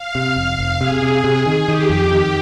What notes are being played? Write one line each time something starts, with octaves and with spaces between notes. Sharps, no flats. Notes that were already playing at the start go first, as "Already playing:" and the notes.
Already playing: F5
C3
F1 F5
F1
C3 G#4
C3
C3
D#3
D#3 G4
F2
D#3